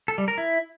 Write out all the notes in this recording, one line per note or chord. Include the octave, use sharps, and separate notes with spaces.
A4
G3
A#4
E4